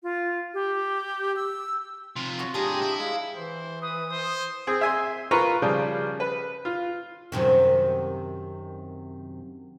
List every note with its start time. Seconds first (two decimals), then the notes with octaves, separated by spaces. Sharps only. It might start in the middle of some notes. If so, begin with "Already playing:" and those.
0.03 F4
0.54 G4
1.36 E6
2.16 C3 F3 F4
2.39 F#4 C#5
2.54 A2 D4 G4 G#4 A#5 D#6
2.82 E4
2.99 G#3 F5
3.35 E3 C5
3.82 B4 D#6
4.12 C5
4.67 C4 G#4
4.81 E5 G#5 C6
5.31 F4 A#4 B4 A#5 C6 C#6
5.62 C#3 F3 G3
6.20 B4
6.65 F4
7.32 F#2 C3 D#3